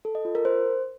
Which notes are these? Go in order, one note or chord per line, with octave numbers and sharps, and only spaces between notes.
A4
D#5
F4
A#4
C5